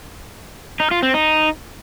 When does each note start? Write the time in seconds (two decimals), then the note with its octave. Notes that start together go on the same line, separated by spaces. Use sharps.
0.80 D#4
0.91 F4
1.03 C4
1.14 D#4